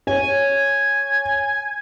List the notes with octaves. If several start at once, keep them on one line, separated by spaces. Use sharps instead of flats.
C#5 G#5